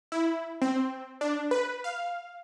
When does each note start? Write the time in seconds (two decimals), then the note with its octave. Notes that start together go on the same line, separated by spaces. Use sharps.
0.12 E4
0.62 C4
1.21 D4
1.51 B4
1.84 F5